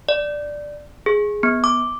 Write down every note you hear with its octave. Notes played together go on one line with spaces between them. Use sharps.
D5
G#4
B3
D6